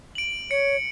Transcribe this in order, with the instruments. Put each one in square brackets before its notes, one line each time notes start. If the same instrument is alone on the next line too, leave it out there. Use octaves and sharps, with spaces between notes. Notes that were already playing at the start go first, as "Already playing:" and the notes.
[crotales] D7 F#7
[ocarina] C#5 [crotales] C#7